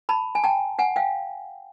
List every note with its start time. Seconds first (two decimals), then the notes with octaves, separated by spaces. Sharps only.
0.09 A5 B5
0.35 G#5
0.44 G5 A5
0.79 F#5 G#5
0.96 F5 G5